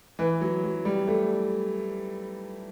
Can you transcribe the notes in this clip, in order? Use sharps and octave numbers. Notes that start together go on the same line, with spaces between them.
E3
F#3
F#3
G3
A3